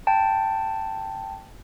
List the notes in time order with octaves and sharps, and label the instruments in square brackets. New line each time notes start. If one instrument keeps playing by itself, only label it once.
[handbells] G5 A5